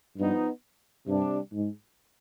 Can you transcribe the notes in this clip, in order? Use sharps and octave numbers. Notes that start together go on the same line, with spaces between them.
G2 F3 B3 D#4
G2 C3 G3 D4
G#2